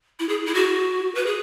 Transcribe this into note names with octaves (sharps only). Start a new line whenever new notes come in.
E4
G#4
E4
F#4
B4
G#4